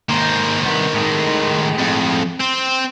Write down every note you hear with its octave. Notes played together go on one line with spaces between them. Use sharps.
G#2 D#3 A#3 C5
C2 B3
A2 G#3
F2
C4